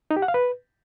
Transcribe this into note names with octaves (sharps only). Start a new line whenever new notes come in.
D#4
G4
F#5
F5
B4